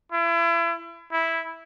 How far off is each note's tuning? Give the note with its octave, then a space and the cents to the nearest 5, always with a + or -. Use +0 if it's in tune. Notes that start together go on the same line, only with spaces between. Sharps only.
E4 +35
E4 -5